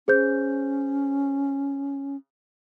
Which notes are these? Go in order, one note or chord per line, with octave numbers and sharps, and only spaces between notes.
C#4 G#4 C5 G6